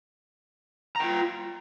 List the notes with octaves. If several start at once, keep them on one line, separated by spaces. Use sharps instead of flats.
F4 G5 A#5